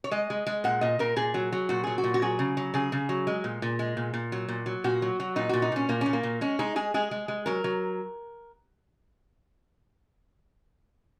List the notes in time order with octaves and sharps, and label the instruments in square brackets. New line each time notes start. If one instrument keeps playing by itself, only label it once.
[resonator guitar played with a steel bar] C#5
G#3 D#5
G#3
G#3
A#2 F#5
A#2 D#5
A#2 A#4
A#2 G#4
F#3
F#3
A#2 F#4
F#3 G#4
F#4
A#2
F#4
F#3 G#4
C#3
F#3
C#3 G#4
C#3
F#3
G#3
A#2
A#2
G#3
A#2
A#2
F#3
A#2
F#3
A#2 F#4
F#3
F#3
A#2 D#4
A#2 F#4
D#4
A#2 C#4
A#2 A#3
A#2 C#4
A#3
A#2
G#3 C#4
G#3 D#4
G#3 G#4
G#3 G#4
G#3
G#3
F#3 A#4
F#3